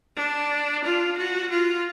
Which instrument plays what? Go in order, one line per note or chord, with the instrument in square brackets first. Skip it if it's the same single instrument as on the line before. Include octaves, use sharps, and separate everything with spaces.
[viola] D4
F4
F#4
F4